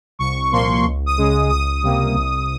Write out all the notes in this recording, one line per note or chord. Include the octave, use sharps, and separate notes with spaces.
C2 C#6
A#2 F3 A#3 C6
C#2
D#6
C#3 G#3
D#6
C#2 D#6
C3 G3 A#3
C2